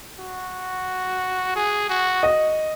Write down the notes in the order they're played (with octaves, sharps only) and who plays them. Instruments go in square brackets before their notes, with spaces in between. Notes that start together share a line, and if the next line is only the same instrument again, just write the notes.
[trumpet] F#4
G#4
F#4
[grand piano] D#5